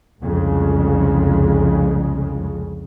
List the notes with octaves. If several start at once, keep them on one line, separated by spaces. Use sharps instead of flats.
C2 F2 C#3 G#3